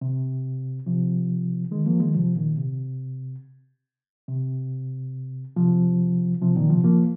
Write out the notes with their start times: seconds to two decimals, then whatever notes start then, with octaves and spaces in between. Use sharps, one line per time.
0.01 C3
0.86 C3 F3
1.71 D#3 G#3
1.86 F3 A#3
2.00 D#3 G#3
2.14 C3 F3
2.36 A#2 D#3
2.58 C3
4.28 C3
5.56 C3 F3
6.42 C3 F3
6.56 A#2 D#3
6.70 C3 F3
6.84 F3 A#3